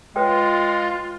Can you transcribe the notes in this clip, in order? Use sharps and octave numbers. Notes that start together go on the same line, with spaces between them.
G#3 F4 B4 C#5 G5